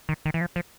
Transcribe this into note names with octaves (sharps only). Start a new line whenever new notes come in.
D#3
D#3
E3
F3
F3